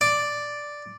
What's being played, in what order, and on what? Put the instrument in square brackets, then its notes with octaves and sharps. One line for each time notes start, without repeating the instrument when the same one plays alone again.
[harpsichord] D5